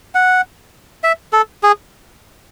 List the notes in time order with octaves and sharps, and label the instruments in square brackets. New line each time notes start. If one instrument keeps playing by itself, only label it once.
[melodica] F#5
E5
A4
G#4